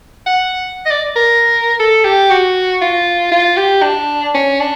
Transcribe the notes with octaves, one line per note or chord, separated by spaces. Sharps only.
F#5
D#5
D5
A#4
A4
G4
F#4
F4
F4
G4
D4
C#4
D4